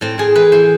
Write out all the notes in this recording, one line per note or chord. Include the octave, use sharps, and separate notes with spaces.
A2 C4
A2 G#4
E3 B4
E3 C5